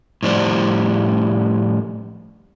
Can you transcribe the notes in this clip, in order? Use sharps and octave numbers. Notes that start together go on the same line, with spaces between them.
A2 F3 G3 C5 D5